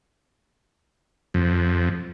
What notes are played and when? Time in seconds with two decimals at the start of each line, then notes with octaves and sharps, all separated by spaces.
1.34 F2